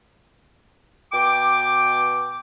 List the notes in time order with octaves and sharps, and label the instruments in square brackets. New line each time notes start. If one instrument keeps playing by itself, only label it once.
[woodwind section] B2 G5 D6